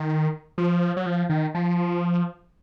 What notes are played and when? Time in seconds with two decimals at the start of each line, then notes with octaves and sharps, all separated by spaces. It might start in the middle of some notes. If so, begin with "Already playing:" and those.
Already playing: D#3
0.58 F3
0.97 F#3
1.06 F3
1.29 D#3
1.55 F3